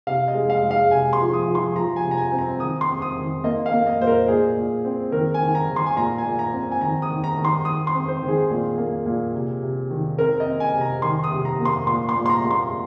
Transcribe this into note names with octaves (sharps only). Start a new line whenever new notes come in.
C3 F5
D#5
G#3
F5
G#3
F5
C3 G#5
C6
F3
D#6
F3
C6
F3 A#5
G#5
C3
A#5
G#5
C4
A#5
D#3 D#6
C6
C4
D#6
D#3
A#3 D#5
F5
A#3
D#5
A#2 C5
A#4
A#2 G#4
A#2
C4
D#3 A#4
G#5
D#3
A#5
D#3
C6
G#5
A#2 A#5
G#5
A#2
A#5
C4
G#5
D#3 A#5
D#6
D#3
A#5
D#3
C6
D#3 D#6
C6
C4
C5
D#3
G#4
A#2
A#3
A#2
C3
C3
D#3
C4 A#4
D#5
C4
G#5
C3
A#5
D#3 C6
D#6
C3
A#5
A#3
C6
A#2 C6
C6
A#2
C6
A#5
A#2
C6